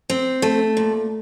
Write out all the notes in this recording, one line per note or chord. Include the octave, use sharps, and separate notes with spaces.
C4
A3
A#2